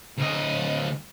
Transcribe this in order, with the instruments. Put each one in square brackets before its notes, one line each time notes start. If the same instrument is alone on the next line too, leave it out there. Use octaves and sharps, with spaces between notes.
[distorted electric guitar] D2 D#5